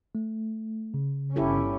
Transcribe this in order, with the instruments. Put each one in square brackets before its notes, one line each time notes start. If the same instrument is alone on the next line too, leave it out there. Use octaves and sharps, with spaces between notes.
[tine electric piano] A3
C#3
[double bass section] G1 C#4 [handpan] E4 G4 A4